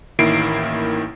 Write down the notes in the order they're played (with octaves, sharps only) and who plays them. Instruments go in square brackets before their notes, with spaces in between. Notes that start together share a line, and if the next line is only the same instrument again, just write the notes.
[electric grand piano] A1 D#3 A#3 E4 C7 D7